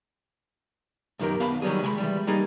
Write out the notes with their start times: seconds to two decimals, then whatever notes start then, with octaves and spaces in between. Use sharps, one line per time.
1.19 B1 F#2 D#3 G4 A#4
1.40 B3 F5 A5 B5
1.62 D#3 F#3 G3 A#3 G#4
1.82 C3 G#3 G#5 B5
1.98 E3 G3
2.27 G3 A#3 D#4 G#4